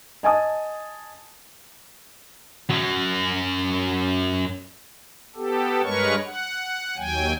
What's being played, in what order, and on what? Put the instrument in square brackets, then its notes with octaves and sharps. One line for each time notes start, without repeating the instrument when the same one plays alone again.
[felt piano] D#5 G#5 A5 D#6
[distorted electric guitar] F#2 F#3
[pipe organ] B3 G4 A4
G2 G#3 A#4 B4 C#5 C#6
F#5
D#2 F#3 G5 G#5